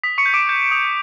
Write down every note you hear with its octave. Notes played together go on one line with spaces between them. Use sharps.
D#6 B6
C#6 C#7
G6
D6 D7
G6
D#6